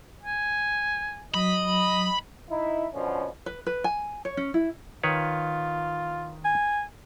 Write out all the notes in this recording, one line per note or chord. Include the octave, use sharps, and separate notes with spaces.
G#5
F#3 D#5 B5
D#4 E4
B2 D3 F3 C#4
B4
B4
G#5
C#5
C#4
E4
D#3 F4 B4 C#5
G#5